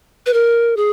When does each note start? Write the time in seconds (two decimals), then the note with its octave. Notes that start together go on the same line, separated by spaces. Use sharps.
0.26 B4
0.34 A#4
0.77 G#4